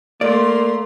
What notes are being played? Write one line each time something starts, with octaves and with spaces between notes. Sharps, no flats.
A3 A#3 D5 C6